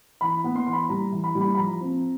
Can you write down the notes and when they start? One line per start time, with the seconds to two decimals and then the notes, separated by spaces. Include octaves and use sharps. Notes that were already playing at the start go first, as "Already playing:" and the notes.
0.21 E3 B5
0.44 B3
0.55 C6
0.67 E3 C6
0.73 B5
0.89 G3 A#5
1.12 E3
1.24 B5
1.35 G3
1.41 B5
1.55 B5
1.57 F3 A#5
1.81 C4